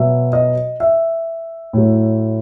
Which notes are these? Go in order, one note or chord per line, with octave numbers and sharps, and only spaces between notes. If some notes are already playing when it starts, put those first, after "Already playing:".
Already playing: B2 F#3 E5
D#5
E5
A2 F#3